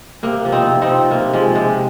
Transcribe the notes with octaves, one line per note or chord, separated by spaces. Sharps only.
C3 A#3
F3
C4 D#4
C3
C4 D#4
F3
C3 A#3
F3 G#3
C3 G#3